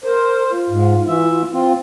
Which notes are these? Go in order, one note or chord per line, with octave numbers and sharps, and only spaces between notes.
A#4 C5
F4
G#2
E3 E5
C4 F4